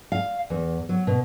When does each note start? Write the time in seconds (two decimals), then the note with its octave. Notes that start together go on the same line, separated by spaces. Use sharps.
0.12 F5
0.50 E2
0.89 F#3
1.07 B2